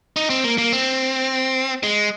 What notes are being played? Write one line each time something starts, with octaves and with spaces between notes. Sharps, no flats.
D#4
C4
A#3
A#3
C4
G#3